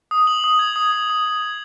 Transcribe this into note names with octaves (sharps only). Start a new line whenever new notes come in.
D#6
F#7
D#6
G#6
D#6
D#6
D#6
D#6
G#6